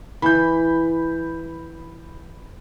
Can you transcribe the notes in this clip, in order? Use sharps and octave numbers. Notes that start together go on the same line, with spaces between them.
E3 B5 G6